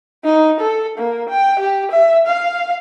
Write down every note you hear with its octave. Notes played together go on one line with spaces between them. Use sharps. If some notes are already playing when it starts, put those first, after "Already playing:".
D#4
A4
A#3
G5
G4
E5
F5